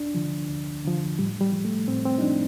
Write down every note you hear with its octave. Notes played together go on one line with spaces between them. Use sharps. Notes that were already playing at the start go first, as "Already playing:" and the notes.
Already playing: D2 D4
D3 F3
D2
D3 F3
A2 G3
G3
F3
A3
A2 C4
C4
D#4
F3 D4